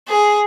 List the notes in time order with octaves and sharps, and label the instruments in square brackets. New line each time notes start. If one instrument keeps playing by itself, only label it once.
[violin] G#4